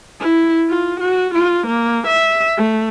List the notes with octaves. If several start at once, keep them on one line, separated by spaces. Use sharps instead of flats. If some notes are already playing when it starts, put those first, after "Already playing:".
E4
F4
F#4
F4
A#3
E5
A3